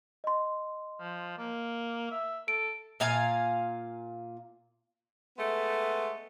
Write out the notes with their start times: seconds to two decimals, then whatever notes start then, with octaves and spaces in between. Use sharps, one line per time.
0.24 D#5 C6
1.00 F3
1.38 A#3
2.11 E5
2.48 A4 D7
3.00 A#2 F5 G#5 A#5
5.37 G#3 A3 B3